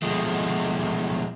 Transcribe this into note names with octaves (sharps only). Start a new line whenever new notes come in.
B2 F3 G#3 A3